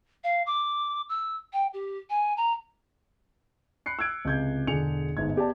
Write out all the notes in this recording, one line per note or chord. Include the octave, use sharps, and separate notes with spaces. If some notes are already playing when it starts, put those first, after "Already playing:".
F5
D6
E6
G5
G4
G#5
A#5
B5 F#6 C7 C#7
E6 F#6 G#6 D7
C#2 C3 G6 G#6
E1 D3 G#4 C#7 F7
G1 G#2 D#4 G#6
B3 G4 D5 A5